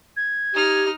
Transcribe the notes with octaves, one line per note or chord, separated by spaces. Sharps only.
G#6
D#4 G4 F6